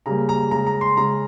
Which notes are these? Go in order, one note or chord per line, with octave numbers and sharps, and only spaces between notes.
C#3 G3 A#3 A#5
A#5
C#3 G#3 A#5
A#5
C6
C#3 G#3 A#5